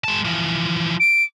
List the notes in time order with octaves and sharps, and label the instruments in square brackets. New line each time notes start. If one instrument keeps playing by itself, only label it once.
[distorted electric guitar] G#3 A5
E3 F3
[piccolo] D7